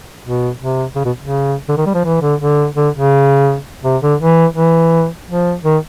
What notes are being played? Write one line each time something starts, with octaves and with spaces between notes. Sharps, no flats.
B2
C3
C#3
B2
C#3
D3
D#3
G3
F3
E3
D3
D3
D3
C#3
C3
D3
E3
E3
F3
D#3